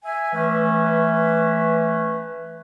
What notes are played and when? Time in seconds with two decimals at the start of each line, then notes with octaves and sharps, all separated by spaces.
0.04 E5 G#5
0.33 E3 A3 C#4 B4